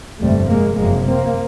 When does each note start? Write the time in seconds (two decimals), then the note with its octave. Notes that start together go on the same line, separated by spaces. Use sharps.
0.20 G1 F2 C3 G3 A3
0.50 G#3 A#3
0.78 F#1 F2 C3 G#3 A#3
1.08 A#3 C4